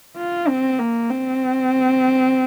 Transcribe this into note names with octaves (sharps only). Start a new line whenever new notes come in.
F4
C4
A#3
C4